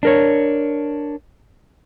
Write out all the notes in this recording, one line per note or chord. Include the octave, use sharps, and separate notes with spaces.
D4 A#4 C#5